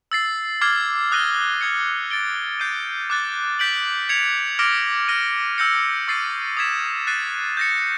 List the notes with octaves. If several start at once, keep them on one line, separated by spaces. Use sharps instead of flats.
E6 A6 C7
D6 F6 G#6 C7
D#6 F#6 A#6 D#7 G7
D#6 G#6 C#7
A6 D7 G7
G6 C7 D#7
D6 F#6 A6
G6 B6 D7 F#7
G#6 C#7 F7
D6 F6 A#6 D7
F6 A#6 D#7
E6 G6 A#6 C#7
C#6 E6 A6 C7 D#7
D#6 G#6 B6 E7
F#6 A6 C7 D#7
G6 A#6 C#7